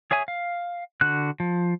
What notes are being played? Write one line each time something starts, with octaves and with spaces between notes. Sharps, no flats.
G#4 C#5 E5 G#5 D#6
F5
D3 F#4 F#6
F3